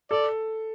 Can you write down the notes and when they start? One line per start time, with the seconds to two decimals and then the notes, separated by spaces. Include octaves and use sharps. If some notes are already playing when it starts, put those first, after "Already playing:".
0.11 A4 D5